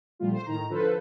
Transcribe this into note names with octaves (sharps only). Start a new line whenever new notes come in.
A#2 D3 F3 G3 A3 F4
C5
A2 D#3 A#5
D3 F3 F4 A4 B4 C5